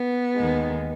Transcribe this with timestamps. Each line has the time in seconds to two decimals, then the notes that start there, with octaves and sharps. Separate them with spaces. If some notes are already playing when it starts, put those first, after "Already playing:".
Already playing: B3
0.34 D#2 D#3 G#3